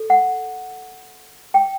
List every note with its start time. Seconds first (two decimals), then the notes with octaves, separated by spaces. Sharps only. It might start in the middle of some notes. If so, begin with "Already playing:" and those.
Already playing: A4
0.10 F#5
1.54 G5